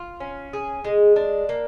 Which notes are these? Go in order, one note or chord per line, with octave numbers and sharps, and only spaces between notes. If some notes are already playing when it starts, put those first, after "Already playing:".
Already playing: F4
C#4
G#4
G#3
D4
A#3